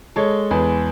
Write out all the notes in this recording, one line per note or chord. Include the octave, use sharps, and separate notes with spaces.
G#3 A4 C#5
E2 G#4 B4